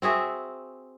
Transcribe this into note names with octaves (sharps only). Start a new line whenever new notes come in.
C4 F#4 G#4 E5